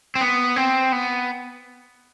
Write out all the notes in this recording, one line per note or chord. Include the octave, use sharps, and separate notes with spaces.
C4
B3
C4
B3